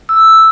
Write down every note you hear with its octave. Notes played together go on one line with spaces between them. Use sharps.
E6